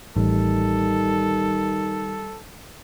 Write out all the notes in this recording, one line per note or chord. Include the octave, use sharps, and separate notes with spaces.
A1 D#3 G3 A4